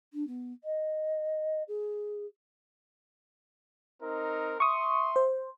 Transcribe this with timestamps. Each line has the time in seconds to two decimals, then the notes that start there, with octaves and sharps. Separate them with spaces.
0.13 D4
0.27 B3
0.64 D#5
1.68 G#4
4.02 C4 D#4 A#4
4.60 E5 C6 C#6 D#6
5.16 C5